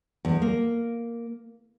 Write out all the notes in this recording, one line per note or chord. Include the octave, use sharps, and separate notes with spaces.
E2
A#3